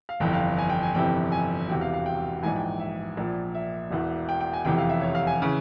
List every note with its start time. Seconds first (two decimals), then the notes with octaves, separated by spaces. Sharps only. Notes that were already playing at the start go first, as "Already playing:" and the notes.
0.09 F5
0.20 G1 F2 E3 G5
0.33 F5
0.58 G#5
0.70 G5
0.83 G#5
0.95 G1 F2 C3 E3 G5
1.32 G#5
1.69 E1 E2 C3 E3 G5
1.81 F5
1.94 F5
2.06 G5
2.43 A#1 G#2 E3 G#5
2.56 G5
2.80 E5
3.17 A#1 A#2
3.55 E5
3.91 E1 E2 E3
4.29 G5
4.41 G5
4.53 G#5
4.65 F1 E2 C3 E3 G5
4.78 F5
4.89 E5
5.02 C#5
5.15 F5
5.27 G#5
5.42 C#3 E3